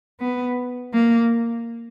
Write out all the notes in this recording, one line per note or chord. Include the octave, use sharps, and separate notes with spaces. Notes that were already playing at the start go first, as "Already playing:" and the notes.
B3
A#3